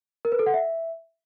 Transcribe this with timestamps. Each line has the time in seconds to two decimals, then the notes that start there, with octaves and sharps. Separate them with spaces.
0.25 A#4
0.32 B4
0.39 A4
0.46 F#5
0.54 E5